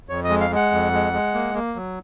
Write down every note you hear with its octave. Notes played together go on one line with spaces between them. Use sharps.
F2 C#5
D#5
G#3
F5
G#3
F#5
F2
G#3
G#3
A#3
A#3
F#3